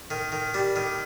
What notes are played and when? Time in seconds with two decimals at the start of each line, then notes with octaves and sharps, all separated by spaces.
0.11 D#3
0.32 D#3
0.54 G3
0.76 D#3